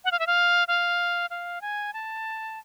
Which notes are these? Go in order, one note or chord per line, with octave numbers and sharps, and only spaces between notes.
F#5
F5
E5
F5
F5
F5
G#5
A5